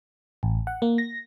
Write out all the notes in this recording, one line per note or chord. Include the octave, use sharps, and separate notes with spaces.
A1
F#5
A#3
A#6